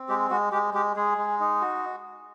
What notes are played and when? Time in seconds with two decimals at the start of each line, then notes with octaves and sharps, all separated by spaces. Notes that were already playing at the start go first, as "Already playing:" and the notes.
Already playing: C4
0.08 G#3 G4
0.30 G#3 F#4
0.52 G#3 G4
0.74 G#3 G4
0.96 G#3 G#4
1.18 G#3
1.40 D#4
1.61 F#4